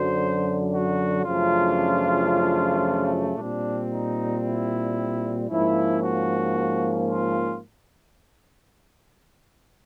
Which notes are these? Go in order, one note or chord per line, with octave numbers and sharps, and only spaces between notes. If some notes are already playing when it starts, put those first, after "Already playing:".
Already playing: F#2 D3 F#3 C5
F#4
F#2 C#3 F3 A3 D4 F4
A#2 G3 C4 D4
D#4
E4
G#2 F3 A#3 C#4 E4
F#4
F4